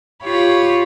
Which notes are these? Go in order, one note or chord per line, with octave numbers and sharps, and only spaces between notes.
F4 G4 C#5 B5 C#6